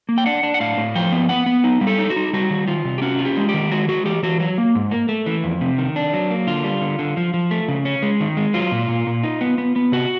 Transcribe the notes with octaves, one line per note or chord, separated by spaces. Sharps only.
A#3
G5
D4 F#5
D4
F#5
A2 F5
A2
F3 G5
B3
B3 F#5
B3
D#4
G3
A4
D#4
F#4
D#4
G3 F#4
D#3
D#3 F4
C3
G4
C#4 F#4
F4
G4
G#3
G4
D#3
G#3 F#4
G#3 F#4
E3 G4
E3 F#4
F#3
A#3
G#2
A#3
A3
E3
F2
C3
D#3
D4
F#3
A#3
D3 F4
G3
D3
D3
F3
F3
A3
C#3
C#4
G#3
D#3
G#3
F#3 F4
A#2
A#2
A#2
D#4
B3
B3
B3
C3 F#4